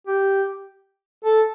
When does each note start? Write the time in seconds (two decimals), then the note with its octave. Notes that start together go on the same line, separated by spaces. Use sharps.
0.07 G4
1.24 A4